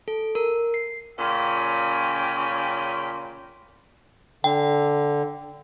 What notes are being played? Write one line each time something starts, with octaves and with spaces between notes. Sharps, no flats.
A4
A#4
C7
A#2 C#3 C#4 F5 G5 B5
D3 G5